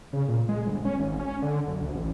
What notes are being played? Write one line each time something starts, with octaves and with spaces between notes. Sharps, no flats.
C#3
A#2
G#3
G1
C#4
G#1
C#4
D3
F#1
D2
A1